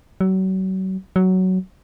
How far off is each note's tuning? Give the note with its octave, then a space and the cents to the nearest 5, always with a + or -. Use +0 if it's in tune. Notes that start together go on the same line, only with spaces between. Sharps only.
F#3 +35
F#3 +10